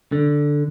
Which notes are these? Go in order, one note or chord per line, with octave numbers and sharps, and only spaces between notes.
D3